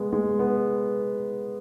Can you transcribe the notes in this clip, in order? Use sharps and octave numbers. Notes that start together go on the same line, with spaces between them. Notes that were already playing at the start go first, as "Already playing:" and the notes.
Already playing: G#3 B3
G#3
B3